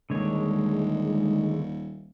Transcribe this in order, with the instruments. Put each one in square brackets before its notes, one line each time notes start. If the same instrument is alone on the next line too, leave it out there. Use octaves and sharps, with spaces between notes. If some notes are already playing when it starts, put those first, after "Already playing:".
[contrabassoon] D#1 [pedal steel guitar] D3 D#3 C#5 [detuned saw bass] G#3